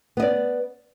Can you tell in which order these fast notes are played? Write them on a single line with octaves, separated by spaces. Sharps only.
B3 D#5 D5